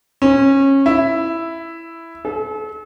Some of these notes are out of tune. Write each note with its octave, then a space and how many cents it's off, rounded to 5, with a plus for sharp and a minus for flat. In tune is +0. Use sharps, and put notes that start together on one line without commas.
C#4 -20
E4 +5
A4 -40